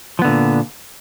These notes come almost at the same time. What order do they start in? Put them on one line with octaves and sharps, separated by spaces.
F3 B3 D3 A#2